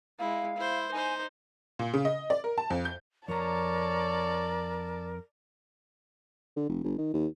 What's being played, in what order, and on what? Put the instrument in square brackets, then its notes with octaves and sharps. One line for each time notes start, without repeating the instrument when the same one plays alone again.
[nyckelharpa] G#3 E4 [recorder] F5
[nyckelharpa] E4 C5
[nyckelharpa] D#4 C5 [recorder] G#5
[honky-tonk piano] A#2
C#3
D#5
D5
A#4
A5
F2
G6
[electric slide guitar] F2 A#5 [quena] A#4 [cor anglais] C#5 [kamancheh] D5 A5
[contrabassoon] D3
F1
G1
D#3
D#2